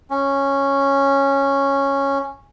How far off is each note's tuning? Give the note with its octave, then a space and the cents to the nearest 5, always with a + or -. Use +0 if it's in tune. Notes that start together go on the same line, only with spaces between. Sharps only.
C#4 -5